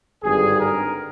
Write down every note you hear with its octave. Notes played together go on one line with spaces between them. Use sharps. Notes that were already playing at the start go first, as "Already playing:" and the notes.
G#1 G2 D3 G#4
A#4